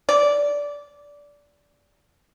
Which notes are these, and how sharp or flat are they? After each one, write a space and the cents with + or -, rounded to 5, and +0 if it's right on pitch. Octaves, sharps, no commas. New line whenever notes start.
D5 -15